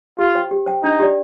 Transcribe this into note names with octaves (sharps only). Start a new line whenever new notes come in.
F4 G4
C5 G5
G4
C5 G5
D4 D#4
G4 D5